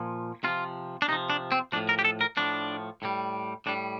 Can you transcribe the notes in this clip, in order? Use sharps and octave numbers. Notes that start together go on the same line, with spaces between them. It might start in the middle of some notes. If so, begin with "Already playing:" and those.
Already playing: A#2 F3
C3 F3 F4
D4
C3 F3 D#4
D4
C4
A2 F3 D4
A#4
G4
A4
A#4
A2 F3 D4
A2 G3
A2 G3 D4